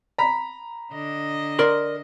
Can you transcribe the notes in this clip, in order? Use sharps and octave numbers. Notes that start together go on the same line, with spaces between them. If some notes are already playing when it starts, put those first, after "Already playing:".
A#5 B5 B6
D3 D#5
A#4 D5 C6